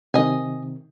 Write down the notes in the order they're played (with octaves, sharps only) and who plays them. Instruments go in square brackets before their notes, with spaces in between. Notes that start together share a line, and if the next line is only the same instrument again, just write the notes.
[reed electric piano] C3 D#3 [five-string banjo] D#5 G#5